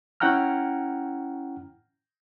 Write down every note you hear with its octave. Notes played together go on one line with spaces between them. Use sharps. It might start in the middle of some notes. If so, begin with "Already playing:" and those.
C#4 E4 F#5 G5 A#5 F6